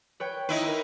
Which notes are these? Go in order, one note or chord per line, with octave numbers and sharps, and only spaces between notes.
B4 C#5 G5
D#4 E4 B4
A#4 E5 A#5